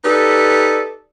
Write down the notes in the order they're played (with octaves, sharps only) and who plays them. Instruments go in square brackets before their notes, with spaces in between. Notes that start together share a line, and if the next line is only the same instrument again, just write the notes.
[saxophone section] D#4 G4 A4 B4 D5